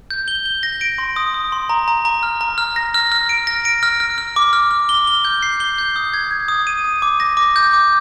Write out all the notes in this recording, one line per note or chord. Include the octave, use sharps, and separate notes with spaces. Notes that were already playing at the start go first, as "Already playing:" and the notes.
G6
G7
G7
A#6
D7
C6
D#6
D#6
C6
A#5
A#5
A#5
F6
A#5
F6
A#6
F6
F6
D7
A#6
D7
F6
F6
F6
D6
F6
F6
G7
G7
G6
C7
G7
G6
D#6
G#6
G#6
D#6
D#7
D#6
D6
A#6
D6
G6
D6